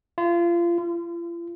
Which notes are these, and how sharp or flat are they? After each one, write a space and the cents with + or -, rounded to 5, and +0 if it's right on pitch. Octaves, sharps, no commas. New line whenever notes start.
F4 -30
F4 -45